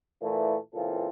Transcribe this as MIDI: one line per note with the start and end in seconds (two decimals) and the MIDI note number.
0.21 0.56 46
0.21 0.56 52
0.21 0.56 57
0.74 1.09 37
0.74 1.09 46
0.74 1.09 52
0.74 1.09 60
0.74 1.09 65
0.74 1.09 69